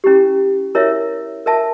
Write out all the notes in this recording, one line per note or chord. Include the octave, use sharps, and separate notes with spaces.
C#4 E4 G4
E4 A#4 C#5 E5
A#4 E5 A5